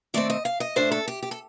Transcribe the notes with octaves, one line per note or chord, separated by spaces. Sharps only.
D#3 A3 C4 D5
D#5
F5
D#5
A2 A3 D4 C5
A4
G4
G4
A4